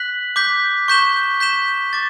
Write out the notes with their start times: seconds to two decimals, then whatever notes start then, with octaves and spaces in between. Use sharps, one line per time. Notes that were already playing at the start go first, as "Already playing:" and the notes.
Already playing: F#6 B6 F#7
0.36 D6 G6 B6
0.88 C#6 G6 B6 E7 G7
1.40 G6 B6 E7 G7
1.93 D6 A6